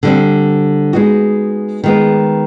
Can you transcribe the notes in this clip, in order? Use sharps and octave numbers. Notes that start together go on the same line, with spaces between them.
D3 G3 C4
G#3 B3 D#4 F#4
D#3 G#3 B3